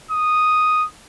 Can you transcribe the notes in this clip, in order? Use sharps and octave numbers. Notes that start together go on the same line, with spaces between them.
D#6